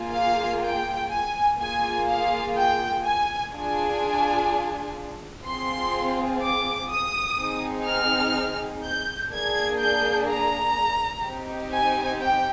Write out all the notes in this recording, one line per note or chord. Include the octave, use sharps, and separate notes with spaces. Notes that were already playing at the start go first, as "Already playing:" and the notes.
Already playing: A#3 F4 G#4
F5
G5
G#5
A#3 F4 G#4 G#5
F5
G5
G#5
D4 F4 G#4 G#5
C4 F4 G#4 C6
D6
D#6
C4 D#4 G#4
F6
G6
A#3 D4 G#4 G#6
G6
A#5
C4 D#4 G4
G#5
G5